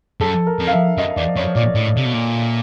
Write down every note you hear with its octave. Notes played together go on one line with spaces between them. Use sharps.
F#2 A4
A#4
F2
F5
E5
F#2 D#5
E2 D5
F2 C#5
A#2 D5
A2
C3
B2
A#2